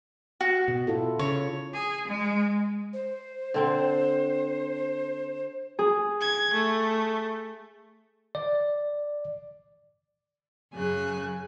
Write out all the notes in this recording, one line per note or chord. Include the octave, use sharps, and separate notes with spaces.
F#4
B2
E4 F4 A4
C#3 C#5
G#4
G#3
C5
D3 C4 G5
G#4
G#6
A3
D5
F#2 C#3 G#5 F#6